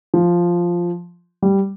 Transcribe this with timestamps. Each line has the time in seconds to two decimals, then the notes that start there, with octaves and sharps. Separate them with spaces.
0.14 F3
1.42 G3